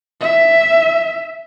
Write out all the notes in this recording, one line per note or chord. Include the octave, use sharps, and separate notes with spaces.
E5